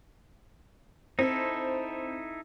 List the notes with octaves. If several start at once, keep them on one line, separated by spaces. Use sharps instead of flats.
C4 D#4 E4 A4